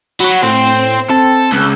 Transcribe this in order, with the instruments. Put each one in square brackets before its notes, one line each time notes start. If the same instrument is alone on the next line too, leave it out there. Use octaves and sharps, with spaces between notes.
[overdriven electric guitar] F#3 F#4 [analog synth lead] B5
[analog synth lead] A2 [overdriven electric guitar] C4 C5
[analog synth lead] C4 [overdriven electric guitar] A4
[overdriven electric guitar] C#2 [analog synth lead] E6